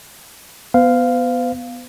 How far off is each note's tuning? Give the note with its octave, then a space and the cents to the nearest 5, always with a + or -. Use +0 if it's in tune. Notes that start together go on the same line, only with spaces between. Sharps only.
B3 +0 C5 -45 F5 +0